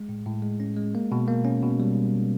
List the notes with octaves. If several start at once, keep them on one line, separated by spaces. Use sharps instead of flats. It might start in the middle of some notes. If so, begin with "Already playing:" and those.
Already playing: G#3
A2
A2
G#3
C#4
G#3
A#3
B2
A#3
C#4
B2
G3